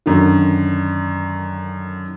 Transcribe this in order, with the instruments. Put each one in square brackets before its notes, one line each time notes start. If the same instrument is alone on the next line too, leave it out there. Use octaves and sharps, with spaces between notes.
[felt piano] F#2 D3 D#3